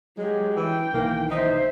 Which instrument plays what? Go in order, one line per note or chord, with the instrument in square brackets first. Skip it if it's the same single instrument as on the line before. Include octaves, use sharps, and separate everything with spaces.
[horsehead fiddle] F#3 G4 [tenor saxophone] G#3
[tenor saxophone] E3 [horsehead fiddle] G5
[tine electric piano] B1 D#3 E3 [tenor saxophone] A#3
[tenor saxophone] D#4 [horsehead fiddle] C5 E5